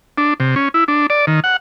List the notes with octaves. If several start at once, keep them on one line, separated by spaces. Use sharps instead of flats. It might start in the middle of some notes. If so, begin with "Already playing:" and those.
D4
C3
C#4
E4
D4
D5
D#3
F#5